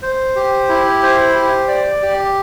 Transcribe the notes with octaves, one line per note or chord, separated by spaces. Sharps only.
C5
G4
E4
C5
G4
D5
G4